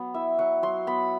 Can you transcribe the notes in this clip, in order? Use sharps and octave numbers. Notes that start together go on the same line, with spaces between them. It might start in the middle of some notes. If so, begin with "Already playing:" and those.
Already playing: F#3 B3
E4 E5
F#3 F#5
F#3 C6
B3 B5